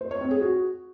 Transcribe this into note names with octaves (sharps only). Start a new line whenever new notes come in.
C5
C#5
C4
G#4
F#4